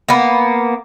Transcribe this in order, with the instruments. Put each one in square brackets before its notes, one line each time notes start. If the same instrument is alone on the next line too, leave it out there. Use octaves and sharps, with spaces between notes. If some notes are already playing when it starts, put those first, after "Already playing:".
[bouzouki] A#3 B3